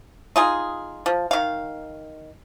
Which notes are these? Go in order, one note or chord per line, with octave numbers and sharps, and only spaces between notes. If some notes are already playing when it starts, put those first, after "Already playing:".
D#4 F4 G#4
F3
D#3 F5